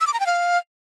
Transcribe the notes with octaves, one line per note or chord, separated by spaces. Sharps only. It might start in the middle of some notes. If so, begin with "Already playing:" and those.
E6
D6
A#5
G5
F5